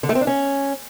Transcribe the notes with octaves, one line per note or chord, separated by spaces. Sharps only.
D3
A3
C4
D4
C#4